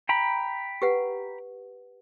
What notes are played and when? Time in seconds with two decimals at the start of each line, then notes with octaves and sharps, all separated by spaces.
0.09 G5 A#5 B5
0.82 G4 B4 F#5